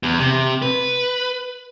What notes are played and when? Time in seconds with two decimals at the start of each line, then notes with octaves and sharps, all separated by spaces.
0.03 E2
0.19 C3
0.62 B4